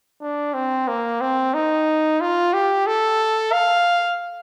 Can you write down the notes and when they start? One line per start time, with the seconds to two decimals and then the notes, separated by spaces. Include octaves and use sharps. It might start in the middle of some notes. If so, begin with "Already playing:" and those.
0.21 D4
0.54 C4
0.88 A#3
1.21 C4
1.54 D#4
2.21 F4
2.54 G4
2.86 A4
3.52 F5